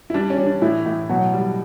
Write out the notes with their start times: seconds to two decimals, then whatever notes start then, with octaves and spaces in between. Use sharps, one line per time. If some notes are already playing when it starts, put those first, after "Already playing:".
0.10 E4
0.14 G3 D4
0.30 C#4
0.38 G3
0.46 D4
0.62 A2 E3 E4
0.86 A2
1.09 B2 F#3 F#4
1.34 G3